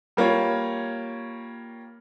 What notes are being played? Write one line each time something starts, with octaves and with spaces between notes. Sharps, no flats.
G3 A#3 F4 C#5